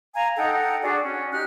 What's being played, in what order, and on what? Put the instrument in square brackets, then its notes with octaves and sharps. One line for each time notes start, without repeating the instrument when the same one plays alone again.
[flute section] F5 G#5 A#5
D#4 A4 F#5 G5
D4 F#4 G#4 D5
C#4
D#4 G4 F6 F#6